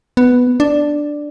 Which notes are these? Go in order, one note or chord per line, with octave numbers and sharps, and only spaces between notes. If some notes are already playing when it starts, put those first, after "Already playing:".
B3
D4